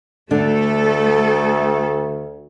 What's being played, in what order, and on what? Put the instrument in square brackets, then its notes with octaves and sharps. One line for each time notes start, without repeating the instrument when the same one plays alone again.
[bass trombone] D2 [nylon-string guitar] D3 D4 [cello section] A3 A4